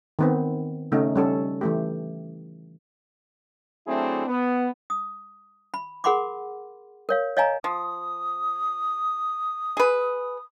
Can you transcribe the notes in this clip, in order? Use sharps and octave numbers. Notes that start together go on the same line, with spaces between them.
D#3 B3 C4
C#3 A3 C#4 D#4
G3 C#4 A4
E3 A3 G4
F#3 A3 C4 D4 E4 G#4
B3
D#6
B5
G#4 A#4 F#5 B5 C6 D6
A#4 C#5 F5
C#5 D#5 F5 G#5 A#5
F3 D#6
G#4 B4